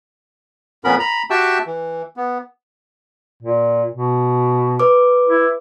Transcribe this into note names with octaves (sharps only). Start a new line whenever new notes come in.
F2 A#2 B3 C#4 A#4 B5
A#5 B5
F#4 G4 E5 G5 A5 E6
E3
B3
A#2
B2
B4 D6
E4